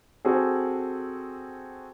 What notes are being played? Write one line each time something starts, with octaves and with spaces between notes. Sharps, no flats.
C4 F#4 G#4 A4